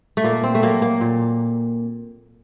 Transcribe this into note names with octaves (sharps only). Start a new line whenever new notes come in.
A3
A#2 A#3
C4
A3
F#3 A#3
A#3
A#2